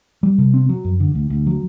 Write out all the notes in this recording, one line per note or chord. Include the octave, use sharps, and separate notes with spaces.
G3
C3
C4
F#3
F#2
D3
D2
D2
F#3